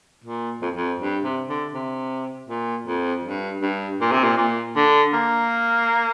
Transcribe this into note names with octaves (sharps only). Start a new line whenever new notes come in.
A#2
F2
F2
G2
C3
D3
C3
A#2
F2
G2
G2
A#2
C3
A#2
A#2
D3
A#3